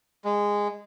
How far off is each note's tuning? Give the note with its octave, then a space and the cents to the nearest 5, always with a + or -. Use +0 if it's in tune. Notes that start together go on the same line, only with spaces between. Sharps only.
G#3 -15